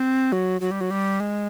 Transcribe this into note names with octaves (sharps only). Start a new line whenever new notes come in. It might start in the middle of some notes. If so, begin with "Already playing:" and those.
Already playing: C4
F#3
F#3
G3
F#3
G3
G#3